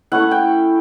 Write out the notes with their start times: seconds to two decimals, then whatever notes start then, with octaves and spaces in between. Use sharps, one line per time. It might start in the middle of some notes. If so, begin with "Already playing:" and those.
0.12 A3 C#4 E4 F#5
0.31 G5